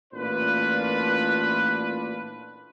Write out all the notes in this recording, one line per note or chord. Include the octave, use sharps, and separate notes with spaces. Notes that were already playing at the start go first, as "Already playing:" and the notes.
A1 A#2 D4 F4 B4